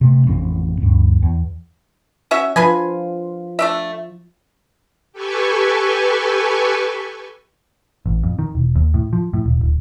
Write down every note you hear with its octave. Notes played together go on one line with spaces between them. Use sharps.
C3 A3
A1 F2 C4
D2 G2
E2
C#4 F#4 E5
F3 D4 F4 B4 G#5
A3 D4 E5
G4 A4 B4 G#5 C#6
A1
F2
D#3
E1
D#2
A2
F3
A2
D#1
D1